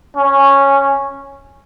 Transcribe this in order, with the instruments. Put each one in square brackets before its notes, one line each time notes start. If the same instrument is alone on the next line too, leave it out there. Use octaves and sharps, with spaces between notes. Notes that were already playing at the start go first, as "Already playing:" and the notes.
[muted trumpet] C#4